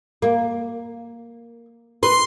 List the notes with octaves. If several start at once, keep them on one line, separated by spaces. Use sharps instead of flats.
A#3
B4 C6